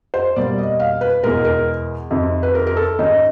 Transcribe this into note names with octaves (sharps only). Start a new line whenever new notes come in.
C5
B2 G3 A#3 D5
D#5
F5
B4
E2 B2 G#3 A#4
A#4
F2 C3 D#3
B4
A#4
A#4
A4
G#2 D#3 G#3 C#4 D#4